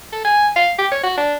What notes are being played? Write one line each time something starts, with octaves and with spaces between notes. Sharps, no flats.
A4
G#5
F5
G4
C#5
F#4
D4